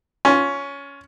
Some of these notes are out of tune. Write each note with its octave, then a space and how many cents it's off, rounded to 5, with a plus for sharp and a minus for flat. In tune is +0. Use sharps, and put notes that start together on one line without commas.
C#4 +15 F4 +20